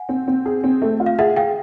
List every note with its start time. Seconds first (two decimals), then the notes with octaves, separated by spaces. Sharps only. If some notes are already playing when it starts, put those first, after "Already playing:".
Already playing: F#5 G#5
0.09 C4
0.28 C4
0.46 G#4
0.64 C4
0.82 A3
1.00 F4
1.06 F5
1.19 G#4 E5 F#5
1.36 G#4 F5 G5